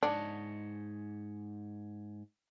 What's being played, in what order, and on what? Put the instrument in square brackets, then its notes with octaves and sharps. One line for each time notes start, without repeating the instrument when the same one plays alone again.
[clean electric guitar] G#2 C#5 D#5 [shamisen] D4